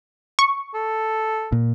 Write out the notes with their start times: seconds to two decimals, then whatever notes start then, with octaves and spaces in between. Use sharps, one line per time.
0.39 C#6
0.74 A4
1.52 A#2